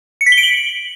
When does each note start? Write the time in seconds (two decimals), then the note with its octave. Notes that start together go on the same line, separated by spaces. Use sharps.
0.21 C#7
0.26 B6
0.32 G7
0.38 D7
0.43 F#7